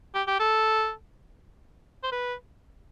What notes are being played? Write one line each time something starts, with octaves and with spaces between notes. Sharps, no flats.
G4
G4
A4
C5
B4